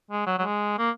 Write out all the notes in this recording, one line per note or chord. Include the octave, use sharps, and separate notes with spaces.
G#3
F#3
F#3
G#3
A#3